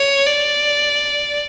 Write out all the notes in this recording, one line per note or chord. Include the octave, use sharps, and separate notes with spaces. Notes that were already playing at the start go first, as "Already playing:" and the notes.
Already playing: C#5
D5